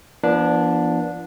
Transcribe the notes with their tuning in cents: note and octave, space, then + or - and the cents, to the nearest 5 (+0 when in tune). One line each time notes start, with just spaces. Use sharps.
F3 -45 B3 -45 D4 -5